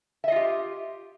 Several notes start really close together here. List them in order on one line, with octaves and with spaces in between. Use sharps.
E5 D#5 F4 G4